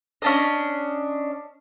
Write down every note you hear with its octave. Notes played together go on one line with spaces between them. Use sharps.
C#4 D4 D#5